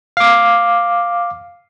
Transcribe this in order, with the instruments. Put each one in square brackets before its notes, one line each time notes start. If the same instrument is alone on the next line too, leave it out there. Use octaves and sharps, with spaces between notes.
[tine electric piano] F5 D6